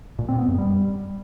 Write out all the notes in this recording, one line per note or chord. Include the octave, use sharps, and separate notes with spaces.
A#2
C4
B3
F#2
G3